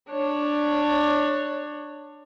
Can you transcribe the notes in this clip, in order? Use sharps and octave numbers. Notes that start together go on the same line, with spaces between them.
D4 C#5